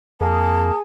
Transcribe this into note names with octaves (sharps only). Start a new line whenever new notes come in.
F2 A#3 G#4 A5